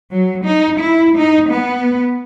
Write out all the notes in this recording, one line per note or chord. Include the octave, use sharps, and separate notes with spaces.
F#3
D#4
E4
D#4
B3